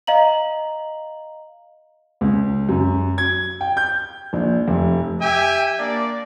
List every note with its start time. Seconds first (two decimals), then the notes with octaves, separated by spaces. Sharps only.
0.07 D#5 F5 A#5 F#7
2.21 C#2
2.69 F#2
3.18 G#6
3.61 G5
3.77 G6
4.33 A#1
4.68 F1
5.21 G4 E5 G5 G#5
5.78 A#3 D4 D5